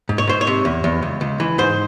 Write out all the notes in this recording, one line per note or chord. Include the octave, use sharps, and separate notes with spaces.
G#2
C#5
G#2 C5
C#5
C3
E2
E2
C#2
C#2
E3
G#2 C5